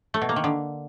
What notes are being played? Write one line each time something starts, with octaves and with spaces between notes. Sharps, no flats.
A3
B2
A#3
D#3
D3